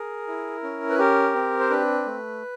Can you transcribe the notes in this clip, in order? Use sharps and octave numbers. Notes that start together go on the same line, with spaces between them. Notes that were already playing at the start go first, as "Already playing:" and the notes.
Already playing: G#4 A#4
E4
C#4
B4
G4 A#4
C4
C5
D4 B4
A3